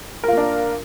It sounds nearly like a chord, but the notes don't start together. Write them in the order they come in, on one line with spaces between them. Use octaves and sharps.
A#4 F4 A#3 D4